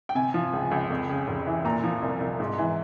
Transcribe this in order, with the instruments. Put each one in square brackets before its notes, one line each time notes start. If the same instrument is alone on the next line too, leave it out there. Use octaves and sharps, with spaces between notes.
[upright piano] G5
C3 G#5
F3
C#2
C#2
F2
C#3
F1
E3
A#2 A#5
F3
C2
C2
G#2
E3